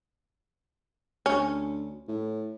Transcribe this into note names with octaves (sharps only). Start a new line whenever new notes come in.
D2 C#4
A2